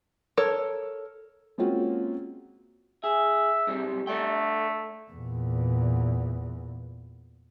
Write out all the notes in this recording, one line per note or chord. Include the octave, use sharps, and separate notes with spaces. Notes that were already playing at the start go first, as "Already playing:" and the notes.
A4 A#4 C#5
G#3 A#3 C4 C#4 F4 F#4
G#4 E5
B1 C3 G3
A3 A4 D5 G5
E2 A#2